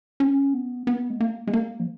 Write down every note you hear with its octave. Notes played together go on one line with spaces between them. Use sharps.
C#4
B3
B3
G#3
A#3
G#3
A#3
F3